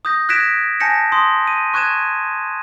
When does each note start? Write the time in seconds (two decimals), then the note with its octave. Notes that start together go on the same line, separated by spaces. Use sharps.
0.05 D#6 G6 A#6
0.29 F#6 G#6 A#6 B6 D7 E7
0.80 G#5 A5 G6 A#6 C#7 E7
1.12 C6 D#6
1.47 D#7
1.74 C#6 F#6 G#6 D#7 E7